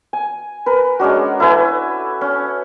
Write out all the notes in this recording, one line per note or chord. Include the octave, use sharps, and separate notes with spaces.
G#5
A#4 B4
G#3 C#4 D4 F#4
E4 A4 B4 G#5
C#4